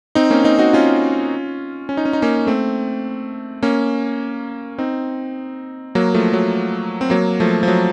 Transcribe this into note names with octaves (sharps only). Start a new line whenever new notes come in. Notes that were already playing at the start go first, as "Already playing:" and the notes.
C4 D#4
A#3 C#4
C4 D#4
D#4 F#4
C#4 F4
C#4
D#4
C#4
D#4
A#3 C#4
A3 C4
A#3 C#4
C4 D#4
F#3 A#3
F3 A3
F#3
C4
F#3 A#3
F3 A3
F3
F#3